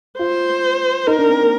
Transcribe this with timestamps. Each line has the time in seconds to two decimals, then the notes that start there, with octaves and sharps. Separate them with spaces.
0.19 F4 C5
1.07 D#4 A#4
1.18 D4
1.29 C4
1.40 A#3